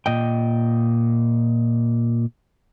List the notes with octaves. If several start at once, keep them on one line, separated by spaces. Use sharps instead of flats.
A#2 D#5 G5